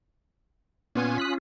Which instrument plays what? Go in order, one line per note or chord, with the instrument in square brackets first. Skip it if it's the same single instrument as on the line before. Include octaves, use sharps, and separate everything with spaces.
[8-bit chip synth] A#2 B3 G#5 [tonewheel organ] C#4 F4
[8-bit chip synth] D#6 F#6 B6